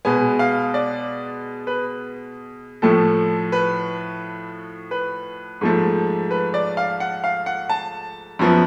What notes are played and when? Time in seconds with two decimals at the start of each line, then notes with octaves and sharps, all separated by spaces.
0.05 B2 G#3 B3 G#5
0.39 F5
0.74 D5
1.67 B4
2.82 A2 F3 A3 A4
3.52 B4
4.91 B4
5.61 G#2 F3 A3
6.31 B4
6.54 D5
6.77 F5
7.00 F#5
7.24 F5
7.46 F#5
7.70 A5
8.39 F#2 F3 B3